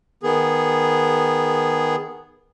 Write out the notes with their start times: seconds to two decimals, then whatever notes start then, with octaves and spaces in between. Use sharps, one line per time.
0.23 D#3 B3 G#4